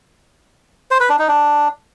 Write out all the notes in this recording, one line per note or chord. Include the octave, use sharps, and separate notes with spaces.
C5
B4
D4
D#4
D4